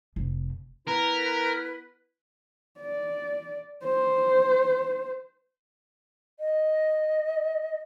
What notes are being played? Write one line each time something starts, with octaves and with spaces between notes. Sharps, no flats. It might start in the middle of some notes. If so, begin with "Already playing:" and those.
F1
B3 E4 A#4 B4
D5
C5
D#5